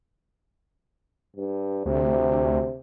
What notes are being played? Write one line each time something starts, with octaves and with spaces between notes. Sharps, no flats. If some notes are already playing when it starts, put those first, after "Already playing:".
G2
D2 C3